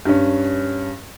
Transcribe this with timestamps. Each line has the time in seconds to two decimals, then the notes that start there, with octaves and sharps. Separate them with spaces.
0.05 G2 C#4